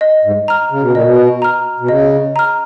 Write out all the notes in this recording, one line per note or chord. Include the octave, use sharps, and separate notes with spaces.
D#5
G#2
A#5 F6
C#3
B2
A#2 D#5
B2
A#5 F6
B2
C#3 D#5
A#5 F6